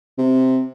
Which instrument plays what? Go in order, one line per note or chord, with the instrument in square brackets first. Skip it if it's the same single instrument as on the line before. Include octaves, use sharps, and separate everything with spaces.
[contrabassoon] C3